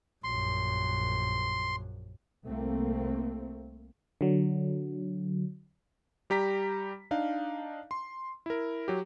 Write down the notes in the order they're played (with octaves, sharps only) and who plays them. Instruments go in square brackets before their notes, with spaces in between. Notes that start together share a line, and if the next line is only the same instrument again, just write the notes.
[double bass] A#1 F#2 [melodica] C6
[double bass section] C2 A3 A#3 C4
[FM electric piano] D3 F#3
[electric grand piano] G3 G4 A#5 B6
D4 D#4 F5
C6
E4 A#4
F#3 G4